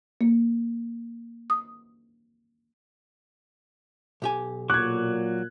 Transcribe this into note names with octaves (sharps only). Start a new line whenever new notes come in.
A#3
D#6
B1 G4 G#5
A#2 F#3 C#6 D6 F#6 G#6